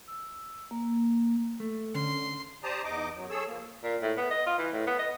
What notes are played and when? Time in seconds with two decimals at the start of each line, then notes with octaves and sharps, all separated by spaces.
0.08 E6
0.71 A#3
1.60 A3
1.95 D3 C#4 C6
2.63 G4 C5 D5 A5 A#5 D#6
2.84 E2 D#4 D#5 D6
3.15 F#2 F#3
3.30 G#4 A4 C#5 E6
3.48 F3 A#3
3.83 A#2
4.02 A2
4.17 B3
4.31 D#5
4.46 F4
4.58 E3
4.73 A2
4.87 B3
4.99 D#5